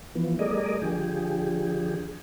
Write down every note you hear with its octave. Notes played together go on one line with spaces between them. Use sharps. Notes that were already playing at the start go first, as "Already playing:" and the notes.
E3 F3 B3
G3 A3 G#4 A#4 D5 D#5
D3 F3 G4 G#4